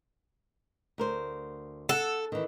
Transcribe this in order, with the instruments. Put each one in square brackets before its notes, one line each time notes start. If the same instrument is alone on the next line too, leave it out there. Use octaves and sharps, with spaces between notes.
[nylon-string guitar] D2 A#4 C5
[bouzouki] A4 [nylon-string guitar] F#5
[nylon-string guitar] D#3 E3